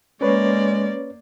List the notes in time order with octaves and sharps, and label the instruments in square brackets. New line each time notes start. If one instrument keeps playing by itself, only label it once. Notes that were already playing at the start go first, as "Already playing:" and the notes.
[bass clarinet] G#3 [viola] A#3 D5 [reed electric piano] C#4 B4 C#5